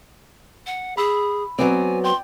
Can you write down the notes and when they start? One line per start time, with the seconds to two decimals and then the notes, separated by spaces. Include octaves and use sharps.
0.66 F#5
0.97 G#4 B5 E6
1.59 F#3 B3 C4 D5 G#5
2.04 G5 C6